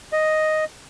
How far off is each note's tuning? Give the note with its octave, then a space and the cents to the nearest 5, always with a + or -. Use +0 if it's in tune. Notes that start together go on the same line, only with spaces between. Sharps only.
D#5 +0